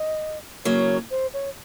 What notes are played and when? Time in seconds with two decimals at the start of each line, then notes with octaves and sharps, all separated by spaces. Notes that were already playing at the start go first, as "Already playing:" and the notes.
Already playing: D#5
0.65 C#3 F#3 A#3 C#5
1.11 C5
1.34 C#5